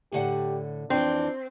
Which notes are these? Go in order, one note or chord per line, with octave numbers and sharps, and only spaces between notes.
A2 D3 G4 F#5
F2 E3 C4 D4